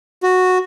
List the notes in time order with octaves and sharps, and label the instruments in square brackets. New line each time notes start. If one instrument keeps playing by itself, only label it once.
[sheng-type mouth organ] F#4